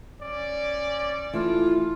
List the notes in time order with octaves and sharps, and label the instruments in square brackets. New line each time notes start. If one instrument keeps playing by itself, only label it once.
[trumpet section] C#4 D5
[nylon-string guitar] E3 A3 [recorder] F4